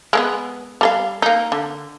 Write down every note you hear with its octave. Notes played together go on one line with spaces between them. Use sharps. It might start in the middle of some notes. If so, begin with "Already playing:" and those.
G#3 A#3 B3
G3 A4 F5
A#3 D#4
D3